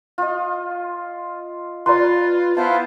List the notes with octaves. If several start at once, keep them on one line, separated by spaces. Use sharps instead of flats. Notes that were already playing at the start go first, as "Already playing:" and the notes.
F4 D#5
F4 B4 D5 A#5 C6
B3 E4 F4 C5 F5 A5